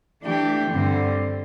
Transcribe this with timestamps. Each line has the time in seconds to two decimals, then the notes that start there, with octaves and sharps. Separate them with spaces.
0.23 E3 A3 D4 G4
0.71 G2 D3 C4